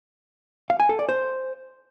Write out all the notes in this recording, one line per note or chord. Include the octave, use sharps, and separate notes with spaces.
F5
G#5
A4
D5
C5